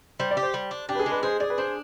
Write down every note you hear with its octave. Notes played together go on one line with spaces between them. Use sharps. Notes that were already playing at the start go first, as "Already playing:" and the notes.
G3 C5
D5
G4
C5
G3
D4
D4 G4
B4
G#4
G#3
B4
G#4 C5
G#4 D5
B4
D4 C5